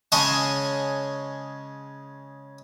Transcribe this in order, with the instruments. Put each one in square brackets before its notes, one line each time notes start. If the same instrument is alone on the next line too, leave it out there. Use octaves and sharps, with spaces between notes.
[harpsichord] C#3 G#3 C#5 D#5 G#5 A5